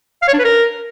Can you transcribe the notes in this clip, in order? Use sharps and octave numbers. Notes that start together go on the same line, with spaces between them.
F5
C#5
D4
B4
A#4